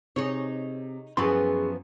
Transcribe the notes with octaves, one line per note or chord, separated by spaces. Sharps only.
C3 D#4 G#4 C#5
F#2 E3 F3 B3 G#4 C6 C#6